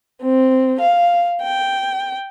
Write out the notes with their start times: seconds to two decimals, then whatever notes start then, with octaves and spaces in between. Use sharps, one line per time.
0.22 C4
0.80 F5
1.42 G5